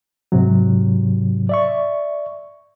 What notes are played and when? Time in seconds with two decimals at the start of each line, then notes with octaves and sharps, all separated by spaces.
0.32 G#2 C3 F#3
1.49 D5 E5 C#6